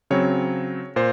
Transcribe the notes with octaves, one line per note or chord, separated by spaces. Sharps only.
C#3 F#3 C4 C#5
A#2 C5